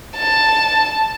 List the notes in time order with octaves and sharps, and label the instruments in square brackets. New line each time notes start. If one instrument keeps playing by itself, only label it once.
[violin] A5